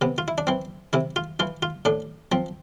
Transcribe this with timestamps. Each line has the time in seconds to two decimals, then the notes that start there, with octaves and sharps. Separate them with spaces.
0.01 C3 B3
0.18 F4
0.28 E4
0.38 D4
0.47 E3 C4
0.93 C3 E4
1.16 F4
1.40 E3 F4
1.63 F4
1.85 A2 D4
2.32 F3 C4